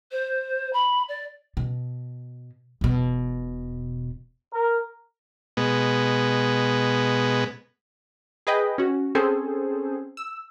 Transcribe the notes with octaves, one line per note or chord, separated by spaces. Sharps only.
C5
B5
D5
B2
E1 B2
A#4
B2 G#3 B3
G#4 B4 D#5 G5
C#4 F#4
C4 C#4 G#4 A4 C5
E6